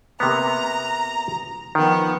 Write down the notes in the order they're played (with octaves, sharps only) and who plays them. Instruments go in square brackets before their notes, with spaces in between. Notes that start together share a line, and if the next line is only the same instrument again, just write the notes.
[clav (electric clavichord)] C3 A#3 B3 [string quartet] A#5
[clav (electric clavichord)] D#3 [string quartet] F3 B3